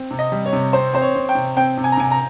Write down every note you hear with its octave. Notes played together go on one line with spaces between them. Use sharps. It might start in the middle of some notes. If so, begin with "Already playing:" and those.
Already playing: C4
C3
D#5
G3
C#5
C3
C4 C5
C4 C5
C#5
C4
G5
C3
C4 G5
C3
G#5
A#5
C3 G#5
A#5